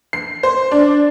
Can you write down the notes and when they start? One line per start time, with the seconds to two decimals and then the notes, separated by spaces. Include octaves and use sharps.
0.13 C7
0.43 C5
0.72 D4